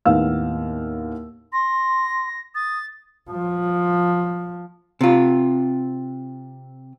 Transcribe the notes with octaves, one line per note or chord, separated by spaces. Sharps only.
D#2 A2 B3 F5 E6
C6 A#6
D#6 A6
F3
C3 F4